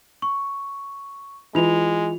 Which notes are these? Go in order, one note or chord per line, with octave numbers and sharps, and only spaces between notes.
C#6
E3 G#3 F4 F7